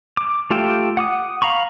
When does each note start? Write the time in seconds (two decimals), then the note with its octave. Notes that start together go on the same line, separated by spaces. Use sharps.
0.17 D6
0.51 A3 F4 G4 E5 G5
0.97 F#5 D6 D#6
1.42 F5 A#5 B5 C#6